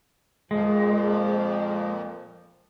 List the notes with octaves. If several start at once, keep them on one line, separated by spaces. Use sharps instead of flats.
F2 A#2 F3 G#3